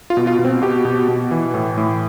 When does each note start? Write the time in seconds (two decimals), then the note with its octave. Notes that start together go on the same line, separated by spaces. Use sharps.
0.10 F4
0.17 B2
0.27 F4
0.39 B2
0.45 C4
0.62 B2 G4
0.85 B2
1.09 B2
1.31 E3
1.54 A2
1.78 A2